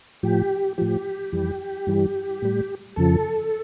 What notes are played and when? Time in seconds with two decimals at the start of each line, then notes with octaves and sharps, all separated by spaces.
0.23 A2 F3 G4
0.78 A2 F3 G4
1.32 F2 E3 G3
1.87 G2 E3 G3
2.42 A2 G3
2.96 F2 C#3 F3 A4